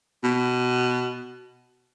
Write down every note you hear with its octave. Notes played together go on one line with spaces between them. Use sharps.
B2